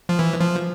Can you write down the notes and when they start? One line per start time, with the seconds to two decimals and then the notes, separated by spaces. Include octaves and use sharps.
0.09 F3
0.19 E3
0.41 F3